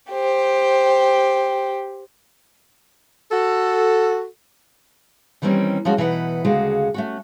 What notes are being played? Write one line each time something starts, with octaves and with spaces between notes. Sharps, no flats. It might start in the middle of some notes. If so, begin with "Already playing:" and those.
G4 C5
F#4 A4
D#3 E3 G3 A#3 C4 C#4
F3 G#3 C#4 F#4
B2 E3 D#4 B4 F#5
D2 C#3 G#3 F#4 F5
A3 C#4 F#4